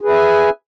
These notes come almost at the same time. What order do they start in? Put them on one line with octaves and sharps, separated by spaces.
G#4 B4 E5 G#5